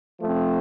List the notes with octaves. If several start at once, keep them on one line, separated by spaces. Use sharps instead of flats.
F3 A3 C4